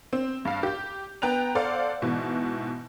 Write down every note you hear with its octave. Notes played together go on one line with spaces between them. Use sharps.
C4
G2 F5
G4 G6
B3 G5 A#5 F#6 F7
A4 C5 D5 F5 F#5
G#2 B2 E3